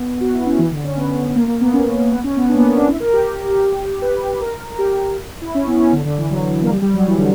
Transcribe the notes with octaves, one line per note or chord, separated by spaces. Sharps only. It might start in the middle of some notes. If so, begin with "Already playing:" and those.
Already playing: B3
F#4
E4
C#4
E3
D3
C#4
B3
A#3
A#3
B3
C#4
B3
C#4
B3
D4
A#3
B3
C#4
D4
E4
A#4
G4
B4
A#4
A#4
G4
E4
C#4
B3
C#4
D3
D3
E3
F#3
A#3
G3
G3
F#3
E3
D3